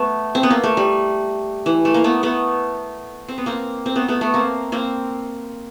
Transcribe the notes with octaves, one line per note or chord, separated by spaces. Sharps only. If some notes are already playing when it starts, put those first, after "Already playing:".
Already playing: A3 B3
C4
B3
A#3
A3
G3
E3
A3
A#3
A3 B3
A3 B3
C4
B3
A#3 C4
C4
A3 B3
A3 B3
A3 B3
A#3 C4
A#3 C4